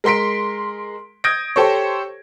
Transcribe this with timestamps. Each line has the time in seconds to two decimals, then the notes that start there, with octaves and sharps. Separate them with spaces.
0.04 G#3 A#4 C6 B6 D7
1.24 D#6 G6 G#6 A#6 D7
1.56 G4 A4 C5 C#5